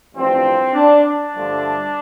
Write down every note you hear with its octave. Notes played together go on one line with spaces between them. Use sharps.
A1 G2 F3 C4
D4
D4
G2 D3 F3 A3